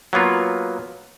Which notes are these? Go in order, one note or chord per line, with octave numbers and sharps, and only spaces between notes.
F#3 A#3 B3 F4